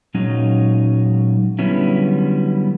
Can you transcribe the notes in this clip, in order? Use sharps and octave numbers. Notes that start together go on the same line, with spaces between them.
A#2 F#3 G#3 C#4 D#4
D3 F#3 G3 B3 C#4 E4